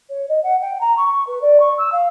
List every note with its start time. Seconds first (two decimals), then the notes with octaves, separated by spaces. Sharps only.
0.10 C#5
0.29 D#5
0.44 F#5
0.61 G5
0.81 A#5
0.97 C#6
1.27 B4
1.42 D5
1.60 C#6
1.78 E6
1.92 F5